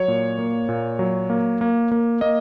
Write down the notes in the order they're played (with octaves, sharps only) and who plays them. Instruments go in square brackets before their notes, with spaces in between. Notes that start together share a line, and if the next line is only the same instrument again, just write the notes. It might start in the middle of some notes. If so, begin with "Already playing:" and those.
Already playing: [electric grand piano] F#3 C#5
A#2
A#3
A#2
F#3
A#3
A#3
A#3
A#3 D#5